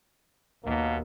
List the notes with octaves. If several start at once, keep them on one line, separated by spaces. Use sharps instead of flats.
D#2 B2 A#3